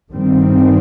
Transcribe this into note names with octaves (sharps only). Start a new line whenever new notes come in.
G2 D#3 G3 C4